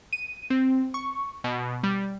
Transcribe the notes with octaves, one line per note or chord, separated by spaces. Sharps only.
D#7
C4
C#6
B2
G3